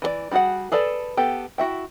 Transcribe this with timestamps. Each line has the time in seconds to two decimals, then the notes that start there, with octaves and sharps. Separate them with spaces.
0.02 E3 G#4 D5
0.31 G3 E4 F#4 G#4 F#5
0.72 G#4 A4 B4 D5 A5
1.17 B3 G4 A4 G5
1.58 E4 F#4 E5 G5